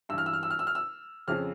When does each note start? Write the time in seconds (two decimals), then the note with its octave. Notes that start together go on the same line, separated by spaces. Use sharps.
0.09 G2 E6
0.13 E3 F6
0.26 E6
0.33 F6
0.43 E6
0.50 F6
0.59 E6
0.67 F6
0.75 E6
1.28 F2 C#3 F3 F6